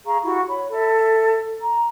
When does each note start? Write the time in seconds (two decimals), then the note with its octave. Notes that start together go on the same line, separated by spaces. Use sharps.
0.06 G#4 F5 A#5 C#6
0.24 E4 F#4 G4 C#6
0.48 C#5 B5
0.71 A4 E5
1.63 A#5